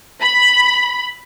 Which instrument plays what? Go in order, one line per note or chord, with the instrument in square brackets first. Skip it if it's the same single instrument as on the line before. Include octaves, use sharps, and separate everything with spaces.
[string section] B5